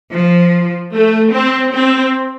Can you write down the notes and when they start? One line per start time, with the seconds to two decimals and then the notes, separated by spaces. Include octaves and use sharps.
0.13 F3
0.92 A3
1.32 C4
1.71 C4